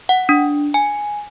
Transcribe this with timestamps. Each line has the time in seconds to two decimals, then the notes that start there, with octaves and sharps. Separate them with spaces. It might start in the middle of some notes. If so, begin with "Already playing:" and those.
0.09 F#5
0.29 D4
0.74 G#5